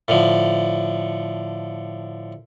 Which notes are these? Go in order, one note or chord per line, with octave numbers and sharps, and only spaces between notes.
A2 D3 F3